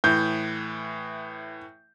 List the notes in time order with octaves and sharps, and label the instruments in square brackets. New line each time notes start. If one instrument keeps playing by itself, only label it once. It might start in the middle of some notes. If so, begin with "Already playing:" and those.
[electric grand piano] A2 E3 [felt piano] G6